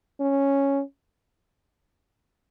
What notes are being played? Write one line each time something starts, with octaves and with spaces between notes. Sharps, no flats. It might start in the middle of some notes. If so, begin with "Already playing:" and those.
C#4